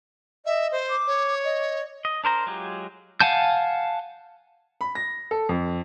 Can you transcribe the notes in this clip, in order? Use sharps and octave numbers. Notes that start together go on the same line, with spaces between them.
D#5 E5
C5
D6
C#5
D#5
D#5
D4 A#4 C5 A#5
F#3 G#3 F4 G4
F5 F#5 G#5 A5 G6
B5
A#6
A4
F2